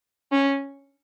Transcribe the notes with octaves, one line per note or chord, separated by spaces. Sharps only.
C#4